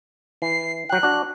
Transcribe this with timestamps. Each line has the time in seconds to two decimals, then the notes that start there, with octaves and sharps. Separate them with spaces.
0.42 E3 C7
0.89 F#3 G5 F#6
1.03 D4 F#4